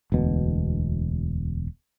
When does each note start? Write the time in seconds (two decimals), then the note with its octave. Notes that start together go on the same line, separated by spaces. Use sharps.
0.12 E1 D2 B2